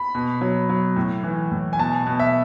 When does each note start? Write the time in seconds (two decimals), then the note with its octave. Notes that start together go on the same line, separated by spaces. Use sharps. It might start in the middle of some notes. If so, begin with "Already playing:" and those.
Already playing: B5
0.15 B2
0.41 F#3
0.69 F#3
0.96 A2
1.24 E3
1.51 A2
1.73 G#5
1.79 B2 A5
2.07 B2
2.19 E5